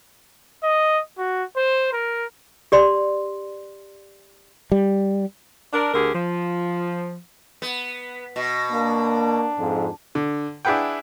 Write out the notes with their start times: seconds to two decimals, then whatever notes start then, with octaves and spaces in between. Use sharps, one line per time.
0.63 D#5
1.18 F#4
1.56 C5
1.93 A#4
2.72 G4 D5 C6
4.72 G3
5.73 D4 A#4
5.93 D2 D3 G4 G#4 A#4
6.14 F3
7.62 B3
8.36 B2
8.71 A#3 D4
9.58 F2 G#2
10.15 D3
10.65 D4 E4 G#4 B4 F#5 G5